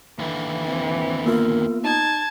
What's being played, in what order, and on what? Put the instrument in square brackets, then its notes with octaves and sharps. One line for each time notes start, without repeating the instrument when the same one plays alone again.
[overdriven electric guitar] D#2 D3 [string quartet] E3
[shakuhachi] C4
[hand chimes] A#3 B3 F4 [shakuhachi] A#4
[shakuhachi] D#4 [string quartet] A5 G#6